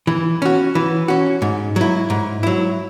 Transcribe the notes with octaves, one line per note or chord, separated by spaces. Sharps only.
E3
C#4 F#4
E3
C#4 F#4
G#2
F#3 E4
G#2
F#3 E4